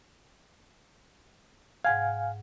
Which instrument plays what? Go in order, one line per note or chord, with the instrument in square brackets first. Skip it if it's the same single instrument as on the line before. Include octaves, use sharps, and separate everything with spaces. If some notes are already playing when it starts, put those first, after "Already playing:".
[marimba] G#2 F#5 G#6 [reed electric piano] F5 G#5